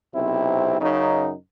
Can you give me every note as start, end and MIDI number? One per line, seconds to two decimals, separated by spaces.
0.14 0.79 35
0.14 0.79 48
0.14 0.79 60
0.14 0.79 64
0.81 1.33 42
0.81 1.33 49
0.81 1.33 63